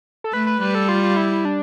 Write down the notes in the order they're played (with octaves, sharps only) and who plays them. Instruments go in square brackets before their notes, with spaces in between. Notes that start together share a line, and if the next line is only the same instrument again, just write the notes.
[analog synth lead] A4
[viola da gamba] A3 [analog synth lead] B4
[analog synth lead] B4
[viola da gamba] G3 [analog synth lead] B4
[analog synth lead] A4
F4
F4
E4
E4
D4